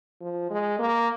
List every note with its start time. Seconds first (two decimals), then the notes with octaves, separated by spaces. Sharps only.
0.21 F3
0.50 G#3
0.79 A#3